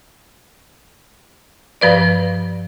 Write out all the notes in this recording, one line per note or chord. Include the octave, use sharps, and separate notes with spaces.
G2 F3 B4 D5